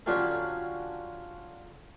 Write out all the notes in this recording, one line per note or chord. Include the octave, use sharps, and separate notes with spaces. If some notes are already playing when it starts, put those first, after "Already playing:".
D3 F#3 C#4 F4 G4 A4